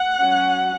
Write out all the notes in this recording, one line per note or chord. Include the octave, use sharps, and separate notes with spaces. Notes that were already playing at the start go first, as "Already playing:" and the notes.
Already playing: F#5
F#3 C#4